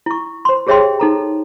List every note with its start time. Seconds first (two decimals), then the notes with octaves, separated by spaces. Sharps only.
0.06 E4 C#6
0.45 C5 C6
0.67 G4 G#4 C#5 E5 G5 C6
0.99 D#4 A4 A#5